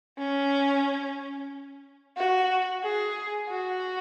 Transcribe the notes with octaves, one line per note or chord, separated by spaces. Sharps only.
C#4
F#4
G#4
F#4